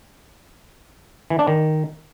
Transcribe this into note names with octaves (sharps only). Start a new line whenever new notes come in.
E3
D4
D#3